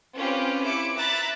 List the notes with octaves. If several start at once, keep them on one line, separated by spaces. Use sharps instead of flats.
C4 C#4 F4 G4 B4
E4 D6 C#7
E5 A#5 B5 F#6 A6